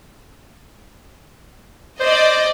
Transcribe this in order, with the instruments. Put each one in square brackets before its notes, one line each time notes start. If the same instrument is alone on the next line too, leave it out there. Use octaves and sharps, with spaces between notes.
[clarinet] C5 [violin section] D5 D#5